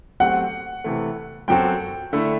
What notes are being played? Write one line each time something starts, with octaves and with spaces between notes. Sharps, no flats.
F#3 A3 C4 G4 F#5
C3 E3 A3
F#2 F#3 C4 F#4 A4 G5
D3 A3 E4